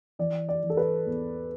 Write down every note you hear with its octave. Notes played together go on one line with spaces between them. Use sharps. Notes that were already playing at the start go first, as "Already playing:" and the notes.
E3 D5
D5
E3
A4
B4
E2